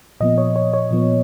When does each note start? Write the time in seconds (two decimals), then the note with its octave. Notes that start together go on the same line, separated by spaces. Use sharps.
0.20 A#2 F3 B3 D#5
0.38 C#5
0.56 C#5
0.74 C#5
0.91 A#2 F3 B3